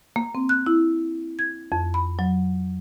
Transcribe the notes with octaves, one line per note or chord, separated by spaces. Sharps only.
A#3
C4
F#6
E4
G#6
F2
B5
F#3